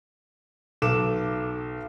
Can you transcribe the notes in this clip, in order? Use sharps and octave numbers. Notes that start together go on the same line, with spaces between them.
B1 A4 D6 E7